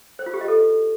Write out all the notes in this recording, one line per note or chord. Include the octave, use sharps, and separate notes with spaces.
C5
F4
G4
D#5
A4